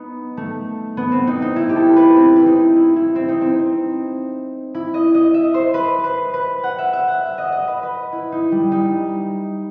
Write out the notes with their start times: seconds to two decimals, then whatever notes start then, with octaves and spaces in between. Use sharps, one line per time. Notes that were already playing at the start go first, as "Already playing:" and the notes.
Already playing: B3 D#4
0.37 A3
0.97 B3
1.12 C4
1.27 D#4
1.42 D#4
1.56 E4
1.69 G4
1.76 A4
1.96 B4
2.16 C4
2.36 E4
2.46 D#4
2.76 E4
2.96 E4
3.15 C4
3.28 D#4
3.41 C4
4.74 E4
4.94 D#5
5.14 D#5
5.34 E5
5.54 C5
5.74 B4
6.04 B4
6.34 B4
6.64 F#5
6.78 E5
6.93 E5
7.08 F#5
7.23 E5
7.38 D#5
7.52 D#5
7.68 B4
7.83 B4
8.12 E4
8.32 D#4
8.52 G3
8.72 D#4